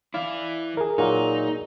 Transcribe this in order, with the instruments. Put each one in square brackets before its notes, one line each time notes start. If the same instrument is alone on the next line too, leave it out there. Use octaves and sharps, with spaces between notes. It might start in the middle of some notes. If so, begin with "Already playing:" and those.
[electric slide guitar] E3 E4 [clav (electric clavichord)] D5 F5
[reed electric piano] G#4 A#4
[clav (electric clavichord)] A#2 F#3 [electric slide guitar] D#4